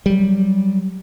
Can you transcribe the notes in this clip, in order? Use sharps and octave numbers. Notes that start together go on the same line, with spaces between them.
F#3 G3